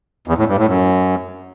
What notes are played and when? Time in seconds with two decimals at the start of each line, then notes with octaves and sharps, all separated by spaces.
0.28 E2
0.38 A2
0.48 G2
0.58 A2
0.68 F#2